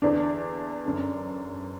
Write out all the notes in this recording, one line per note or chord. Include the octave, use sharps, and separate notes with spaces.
E2 D3 D4
F#2 D3